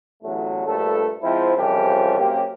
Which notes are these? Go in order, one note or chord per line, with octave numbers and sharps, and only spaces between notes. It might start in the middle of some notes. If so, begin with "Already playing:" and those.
A1 E2 F#3 A3
A#1 G2 A3 A4
F3 G#3 C4 E4
C2 F2 C#3 E3 F3 G4
F#2 C#3 A#3 C4 G4